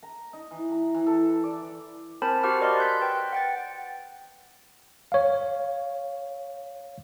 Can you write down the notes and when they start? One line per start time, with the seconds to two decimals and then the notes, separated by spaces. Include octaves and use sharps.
0.03 A#5
0.33 D#4
0.51 E3
0.71 A#5
0.95 E3
1.06 A4
1.44 D5
2.22 C4 A#4 C5 G#5 A5 B5
2.43 F#4 G4 C5 F#5 D6 F6
2.61 A#4 D5 D#5 A5 C6
2.79 F#6 G6 B6
3.01 B4 G5
3.33 F#5 G5 A6
5.12 C#5 F5